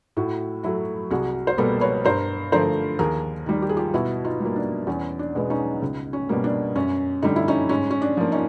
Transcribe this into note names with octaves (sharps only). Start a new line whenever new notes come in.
A2 E4 F#4
F#3 A3 E4 F#4
C2 F#4 G#4
C5
B2 G3 A#3 A4 B4
B4 C#5
G2 A#4 C5
D3 F3 A3 A#4 C5
D#2 G#4 A#4
D#3 G3
G4
G#4
F4 G4
B2 E4 F#4
D#4 F4
G3
A#3
D4
E2 C#4
D4
B2 G#3 B3
C#4 D#4
C#2
C#4
B2 G3 A#3
D4
F#2 C#4
D3 G3 D#4
E4
C#4 D#4
G#2 C#4
C#4
D4
F3 A#3
C#4 D#4